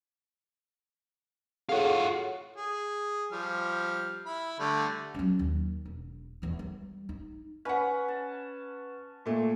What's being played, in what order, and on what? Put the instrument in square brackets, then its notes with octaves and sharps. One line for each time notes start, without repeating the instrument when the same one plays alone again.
[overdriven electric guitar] F4 F#4 [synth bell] G#4 A4 C#5
[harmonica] G#4
F3 G3 F6
E4 B5
D3 G3 A3
[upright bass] F#3 C#4
D#2
E1
E2 E3
G3
D#4
[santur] C#4 [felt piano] B4 F#5
[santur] A5
[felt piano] A#2 A3